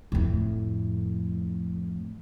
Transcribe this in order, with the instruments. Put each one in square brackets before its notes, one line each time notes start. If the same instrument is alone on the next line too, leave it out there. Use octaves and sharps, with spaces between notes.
[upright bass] F2 A2